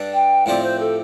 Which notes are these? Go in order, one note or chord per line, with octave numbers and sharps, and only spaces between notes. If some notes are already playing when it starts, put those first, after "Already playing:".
Already playing: G2 G3 D4 A4
G5
A2 F3 C4 G4 D5
C5
A4